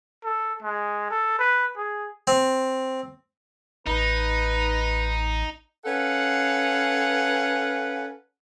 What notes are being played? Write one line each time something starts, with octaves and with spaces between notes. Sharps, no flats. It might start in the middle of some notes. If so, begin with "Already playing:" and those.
A4
G#3
A4
B4
G#4
C4
A1 D#4 B4
C#4 A4 B4 F5 F#5